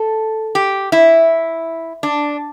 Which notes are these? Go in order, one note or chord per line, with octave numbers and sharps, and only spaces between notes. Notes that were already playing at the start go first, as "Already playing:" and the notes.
Already playing: A4
G4
E4
D4